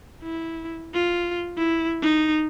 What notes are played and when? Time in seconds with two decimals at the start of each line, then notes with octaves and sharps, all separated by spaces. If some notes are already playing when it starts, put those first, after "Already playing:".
0.23 E4
0.94 F4
1.57 E4
2.02 D#4